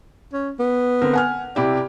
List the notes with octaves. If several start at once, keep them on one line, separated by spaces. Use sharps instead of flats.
C#4
B3
D3 C4 A#4
F#5 G#5 F6
C3 E4 G4 D5